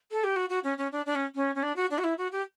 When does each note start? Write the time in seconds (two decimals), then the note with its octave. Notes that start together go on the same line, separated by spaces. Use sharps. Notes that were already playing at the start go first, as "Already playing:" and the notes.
0.11 A4
0.24 G4
0.36 F#4
0.49 F#4
0.64 C#4
0.78 C#4
0.92 D4
1.06 D4
1.15 C#4
1.35 C#4
1.55 C#4
1.63 D4
1.76 F#4
1.91 D4
1.98 F#4
2.04 E4
2.18 F#4
2.32 G4